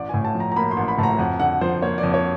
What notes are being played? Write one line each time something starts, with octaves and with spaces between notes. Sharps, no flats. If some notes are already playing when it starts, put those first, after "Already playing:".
Already playing: A1 D5
A2 G#5
A5
F3
A#5
A#5
A#3 B5
C6
A1
B5
A2 A5
A#5
F2 F#5
D3 F#5
F3 C5
A#3 C#5
D5
F2
C#5